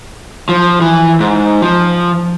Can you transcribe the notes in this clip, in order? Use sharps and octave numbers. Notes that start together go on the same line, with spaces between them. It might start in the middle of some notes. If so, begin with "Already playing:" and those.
F3
E3
G#2
F3